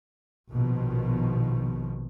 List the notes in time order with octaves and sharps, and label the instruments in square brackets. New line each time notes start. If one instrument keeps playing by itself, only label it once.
[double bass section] A#1 B2 D#3 F3